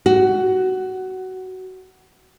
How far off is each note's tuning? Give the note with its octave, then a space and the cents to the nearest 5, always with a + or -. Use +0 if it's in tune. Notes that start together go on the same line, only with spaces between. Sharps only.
F#4 +15